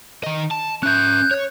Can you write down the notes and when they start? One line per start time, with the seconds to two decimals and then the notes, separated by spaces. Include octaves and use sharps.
0.24 D#3 D#5
0.51 A5
0.83 C#4 E5 F#6 G6
1.31 C#5